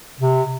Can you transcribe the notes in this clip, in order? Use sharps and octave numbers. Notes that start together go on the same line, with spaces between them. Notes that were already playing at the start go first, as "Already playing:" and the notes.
C3